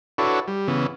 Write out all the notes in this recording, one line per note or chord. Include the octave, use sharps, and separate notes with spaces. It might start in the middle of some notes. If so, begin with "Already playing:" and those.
D4 E4 F#4 A4 B4 C#5
G3
C#3 E3 B3